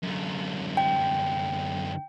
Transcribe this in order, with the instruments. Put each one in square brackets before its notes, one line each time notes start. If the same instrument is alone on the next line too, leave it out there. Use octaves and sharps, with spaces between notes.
[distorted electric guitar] F#2 D3
[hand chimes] G5